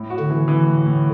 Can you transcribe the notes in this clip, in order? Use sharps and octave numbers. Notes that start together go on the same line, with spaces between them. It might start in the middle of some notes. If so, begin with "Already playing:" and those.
Already playing: A2
F#4
D3
E3
E3
A2
A2